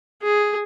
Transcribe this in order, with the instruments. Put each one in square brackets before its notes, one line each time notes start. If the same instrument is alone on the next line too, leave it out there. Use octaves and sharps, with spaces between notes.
[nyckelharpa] G#4